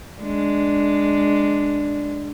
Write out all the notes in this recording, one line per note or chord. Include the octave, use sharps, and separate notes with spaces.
G#3 D4